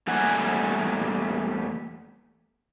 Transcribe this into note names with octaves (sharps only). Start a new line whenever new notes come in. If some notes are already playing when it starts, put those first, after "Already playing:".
E2 G3 A3 A#3 F#5 G#5